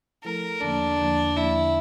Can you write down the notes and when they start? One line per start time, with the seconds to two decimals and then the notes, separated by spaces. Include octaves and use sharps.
0.24 F3 A3 E4 A4 A#4
0.61 E2 D3 F3 A#3 D4
0.99 E2 D3 F3 A#3
1.36 E2 D3 F3 A#3 E4